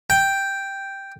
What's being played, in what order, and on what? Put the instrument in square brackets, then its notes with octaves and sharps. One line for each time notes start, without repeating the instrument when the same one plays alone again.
[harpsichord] G5